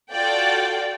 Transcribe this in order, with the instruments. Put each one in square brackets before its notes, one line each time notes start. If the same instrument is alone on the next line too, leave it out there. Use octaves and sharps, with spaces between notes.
[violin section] F4 F#4 A4 D5 G5